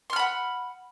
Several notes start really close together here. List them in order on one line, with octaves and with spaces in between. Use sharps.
C6 F6 B5 F#5